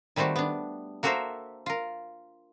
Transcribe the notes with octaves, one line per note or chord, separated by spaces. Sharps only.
D#3 G3 A3 C4 F#4 G4
B3 D4
A#3 F#4 A4 A#4 C5 E5
F4 A#4